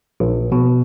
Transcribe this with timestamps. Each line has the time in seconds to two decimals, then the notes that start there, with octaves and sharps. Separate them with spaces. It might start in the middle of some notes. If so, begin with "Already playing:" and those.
0.20 A#1
0.52 B2